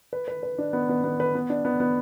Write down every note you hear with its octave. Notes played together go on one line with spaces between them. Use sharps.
B4
B4
B4
D4
B3
B3
B3
B4
B3
D4
B3
B3